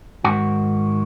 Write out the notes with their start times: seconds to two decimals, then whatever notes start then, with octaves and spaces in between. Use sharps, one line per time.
0.24 G#2 D#3 F#4